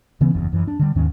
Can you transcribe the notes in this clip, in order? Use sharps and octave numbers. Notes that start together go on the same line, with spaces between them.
C#3 E3 B3 C#4
F#1 E2
F#2 E3
D4
D3 G3
D#2 G#2 D#3 C#4